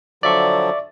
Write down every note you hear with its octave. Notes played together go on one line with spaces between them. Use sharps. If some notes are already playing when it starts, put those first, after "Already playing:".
D3 F3 F#3 D5 E5 C#6